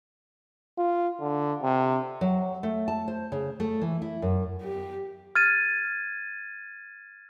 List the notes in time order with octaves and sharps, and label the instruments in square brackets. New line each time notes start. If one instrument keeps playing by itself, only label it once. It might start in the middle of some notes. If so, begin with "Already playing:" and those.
[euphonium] F4
D3
C3
[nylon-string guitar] F#3
A3
A5
C5
C#3
A3
E3
E4
F#2
[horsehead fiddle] G4
[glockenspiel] F6 G#6 A6 D#7